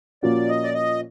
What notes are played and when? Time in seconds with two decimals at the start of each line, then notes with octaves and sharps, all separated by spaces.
0.23 A#2 F3 A#3 C#4 F#4 D5
0.49 D#5
0.64 D5
0.74 D#5